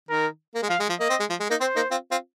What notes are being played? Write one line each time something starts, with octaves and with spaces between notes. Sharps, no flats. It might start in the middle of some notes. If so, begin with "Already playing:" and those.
D#3 A#4
A#3
G#3
F3 F5
G#3
F3
A#3 D#5
C4
G#3
F3
G#3
A#3 D#4
C4 C5
A#3 D#4
C4 F4
C4 F4